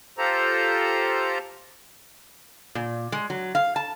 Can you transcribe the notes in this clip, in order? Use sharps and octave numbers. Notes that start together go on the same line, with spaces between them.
F4 G4 A4 C5 A#5
A#2
G#3
F#3
F5
A5